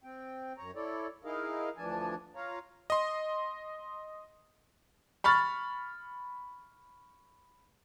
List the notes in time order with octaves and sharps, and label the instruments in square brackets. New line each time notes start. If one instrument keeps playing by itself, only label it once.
[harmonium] C4 G5
F#2 C#5 A#5
E4 A4 C#5 D5
D#4 E4 G#4 A#4 D#5 F5
D2 E3 F3 D4 G#5 A5
F4 C#5 F5 A#5
[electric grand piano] D#5 C6
[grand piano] B5 C#6 F6 A6